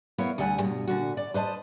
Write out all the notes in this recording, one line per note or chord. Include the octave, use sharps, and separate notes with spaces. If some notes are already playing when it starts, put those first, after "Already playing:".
B3 E4 A#4 C#5 F5
D2 G3 C#5 D#5 F#5 G#5
G2 B2
A#2 D3 F#4
D5
B4 C5 D#5 A5